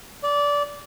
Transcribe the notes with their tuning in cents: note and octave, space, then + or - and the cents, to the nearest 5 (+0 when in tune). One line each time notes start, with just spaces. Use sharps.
D5 -20